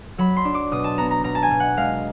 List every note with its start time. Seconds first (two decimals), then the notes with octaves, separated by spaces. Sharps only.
0.18 F#3 B5
0.36 C6
0.45 D4
0.54 D6
0.72 B2 D#6
0.84 A5
0.98 B3 A#5
1.11 A#5
1.24 B2 A#5
1.35 A5
1.43 G#5
1.51 B2
1.60 F#5
1.77 G#3 F5